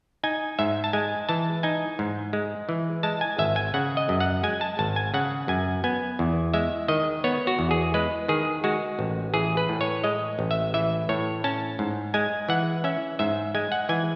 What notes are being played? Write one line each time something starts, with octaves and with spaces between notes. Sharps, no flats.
D#4 G#5
G#2 E5
A5
G#3 G#5
E3 A5
D#4 G#5
G#2
G#3
E3
G#3 A5
G#5
G#1 E5
G#5
C#3 F#5
D#5
F#2
F#5
G#3 G#5
A5
G#1 A5
G#5
C#3 F#5
F#2 G#5
B3 G#5
E2
G#3 E5
D#3 D#5
B3 C#5
F#4
E2
G#4
G#3 B4
D#3 G#4
G#3 F#4
A1
E3 G#4
B4
A2
C#5
G#3 D#5
A1
E5
E3 E5
A2 C#5
C#4 A5
G#2
G#3 G#5
E3 F#5
C#4 E5
G#2 E5
G#3 G#5
F#5
E3 G#5